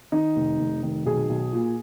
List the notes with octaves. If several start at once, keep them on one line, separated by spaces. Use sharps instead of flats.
D#3 D#4
F1
F1
D#3
B1 G#4
B1
A#2